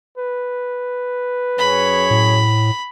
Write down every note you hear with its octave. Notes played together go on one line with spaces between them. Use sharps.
B4
F#2 G#4 C#5 B5
A2